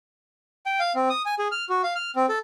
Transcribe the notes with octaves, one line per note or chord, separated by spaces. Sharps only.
G5
F5
C4
D#6
G#5
G#4
F6
F#4
F5
F6
C4
A4